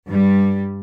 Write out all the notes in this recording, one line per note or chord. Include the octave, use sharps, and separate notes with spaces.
G2 G3